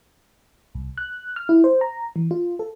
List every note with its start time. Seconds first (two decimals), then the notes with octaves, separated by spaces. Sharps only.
0.75 C2
0.98 F#6
1.36 F6
1.49 E4
1.64 C5
1.81 A#5
2.16 E3
2.31 F4
2.59 A4